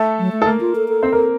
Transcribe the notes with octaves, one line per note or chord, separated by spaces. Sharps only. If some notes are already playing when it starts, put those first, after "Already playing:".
Already playing: A3 A4
F#3
A3
A4
A3 A#3 A#4
F4
A4
A4
C4 C5
A#3 A#4